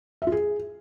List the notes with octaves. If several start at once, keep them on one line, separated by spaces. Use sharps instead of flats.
E5
F4
G#4